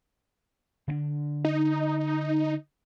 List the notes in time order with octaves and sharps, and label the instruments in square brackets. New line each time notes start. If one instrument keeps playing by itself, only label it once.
[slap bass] D3 C4 D4
[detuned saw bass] D#4